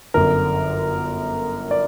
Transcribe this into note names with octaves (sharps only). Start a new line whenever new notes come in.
G1 F#2 D3 A#4
D5